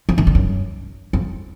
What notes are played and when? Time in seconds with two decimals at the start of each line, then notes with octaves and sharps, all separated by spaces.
0.09 F3
0.18 D#3
0.27 D3
0.35 F#2
1.13 F2